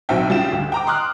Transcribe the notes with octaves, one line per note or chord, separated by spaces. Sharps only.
B1 C4 F#4 E5 G5
C#3 G3 F4 G5 E7
D2
G5 A#5 D6
C6 D6 D#6 F6 F#6